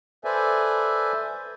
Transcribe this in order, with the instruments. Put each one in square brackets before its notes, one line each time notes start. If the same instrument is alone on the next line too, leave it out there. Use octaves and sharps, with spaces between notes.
[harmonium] A4 B4 C5 D5 E5 G#5